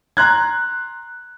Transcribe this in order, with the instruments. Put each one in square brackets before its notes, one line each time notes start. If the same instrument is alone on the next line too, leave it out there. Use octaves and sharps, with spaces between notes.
[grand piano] A#5 C6 F#6 G#6